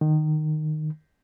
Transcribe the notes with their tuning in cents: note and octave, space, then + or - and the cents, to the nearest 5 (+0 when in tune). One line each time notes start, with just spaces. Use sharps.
D#3 -20